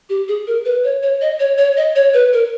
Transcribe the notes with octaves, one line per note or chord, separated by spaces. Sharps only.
G4
G#4
A#4
B4
C#5
C#5
D#5
C#5
C#5
D#5
C#5
B4
A#4